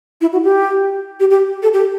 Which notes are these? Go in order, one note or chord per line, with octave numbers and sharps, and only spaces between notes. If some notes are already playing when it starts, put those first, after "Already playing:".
E4
F#4
G4
G4
G4
A4
G4